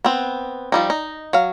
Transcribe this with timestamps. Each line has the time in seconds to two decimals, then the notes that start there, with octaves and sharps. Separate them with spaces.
0.05 B3 C4
0.72 F3 G3 D#4
0.90 D#4
1.33 F#3 F5